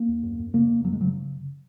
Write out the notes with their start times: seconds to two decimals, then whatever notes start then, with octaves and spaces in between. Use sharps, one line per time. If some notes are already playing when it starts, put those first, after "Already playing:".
Already playing: A#3
0.08 D#2
0.23 F#2
0.39 F#2
0.54 C#3 A#3
0.69 F2
0.84 F#2 F#3
0.92 G#3
1.00 C#3 F#3